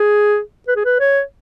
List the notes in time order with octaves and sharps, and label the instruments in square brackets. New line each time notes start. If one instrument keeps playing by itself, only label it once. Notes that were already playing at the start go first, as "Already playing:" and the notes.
Already playing: [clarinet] G#4
B4
G#4
B4
C#5